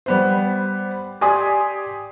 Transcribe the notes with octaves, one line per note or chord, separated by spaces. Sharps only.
G3 B3 C5
G4 D5 G#5 C6 D#6